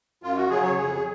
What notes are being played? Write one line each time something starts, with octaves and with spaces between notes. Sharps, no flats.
F#2 F4
F#4
C#3 F#3 G#4
C#5
F2 G#4